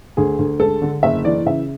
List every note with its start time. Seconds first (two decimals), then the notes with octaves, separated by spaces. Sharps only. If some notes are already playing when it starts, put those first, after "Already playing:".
0.17 D2 G#4
0.39 D2
0.60 G#3 A4
0.82 D3
1.03 F#1 E5
1.25 E3 D5
1.46 C#3 E5